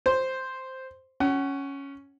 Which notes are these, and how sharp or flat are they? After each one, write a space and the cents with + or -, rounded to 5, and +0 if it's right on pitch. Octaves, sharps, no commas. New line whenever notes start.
C5 +0 C6 +0
C#4 +0 F#5 +30